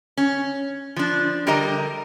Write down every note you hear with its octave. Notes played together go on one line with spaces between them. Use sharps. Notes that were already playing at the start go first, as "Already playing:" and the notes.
C#4
F3 D4
D3 G3 A#4 D#5 A#5